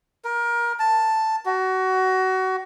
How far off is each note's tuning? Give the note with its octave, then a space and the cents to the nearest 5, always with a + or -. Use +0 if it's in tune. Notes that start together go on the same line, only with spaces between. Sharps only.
A#4 +25
A5 +5
F#4 +25